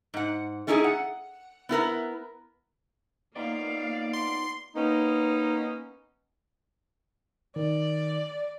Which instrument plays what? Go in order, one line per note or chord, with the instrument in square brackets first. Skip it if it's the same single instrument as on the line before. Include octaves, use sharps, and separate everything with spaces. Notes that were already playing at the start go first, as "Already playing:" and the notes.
[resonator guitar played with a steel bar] G#2 F#5
A3 C#4 D#4 E4 G4 G#4
F#5
B3 E4 A#4 B4
[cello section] A#3 F5 [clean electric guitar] B3 D#4 F4 [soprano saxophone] D5
[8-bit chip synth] C6
[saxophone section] A#3 B3 C#4 D#4
[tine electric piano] D#3 [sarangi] D5